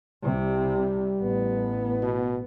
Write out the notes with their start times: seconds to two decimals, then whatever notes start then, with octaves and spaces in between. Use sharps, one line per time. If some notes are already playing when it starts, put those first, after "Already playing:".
0.23 C2 C3 G3
1.21 A1 B3
2.02 B2